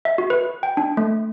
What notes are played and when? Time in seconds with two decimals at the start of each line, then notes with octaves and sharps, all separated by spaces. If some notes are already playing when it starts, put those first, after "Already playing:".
0.05 E5
0.18 F#4
0.30 B4
0.63 G5
0.77 D4
0.97 A3